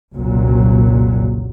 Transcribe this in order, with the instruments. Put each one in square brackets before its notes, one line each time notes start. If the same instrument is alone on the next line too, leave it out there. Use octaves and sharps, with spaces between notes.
[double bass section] F#1 C2 A#2 F#3